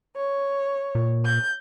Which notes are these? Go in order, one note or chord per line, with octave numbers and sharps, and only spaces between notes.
C#5
A#2
G6